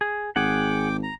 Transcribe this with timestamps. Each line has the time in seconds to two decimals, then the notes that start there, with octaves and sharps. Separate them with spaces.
0.01 G#4
0.36 G#1 G#4 F#5 G5 D6
1.03 A#5